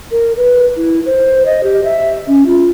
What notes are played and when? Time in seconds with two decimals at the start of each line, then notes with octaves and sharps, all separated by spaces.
0.12 A#4
0.37 B4
0.77 E4
1.06 C5
1.46 D#5
1.63 G4
1.84 E5
2.27 C#4
2.46 F4